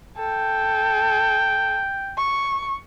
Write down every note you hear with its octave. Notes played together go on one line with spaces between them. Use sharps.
A4 G5
C#6